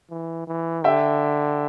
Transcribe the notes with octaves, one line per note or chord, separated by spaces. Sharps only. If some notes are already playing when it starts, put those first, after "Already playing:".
E3
E3
D3 E5 G5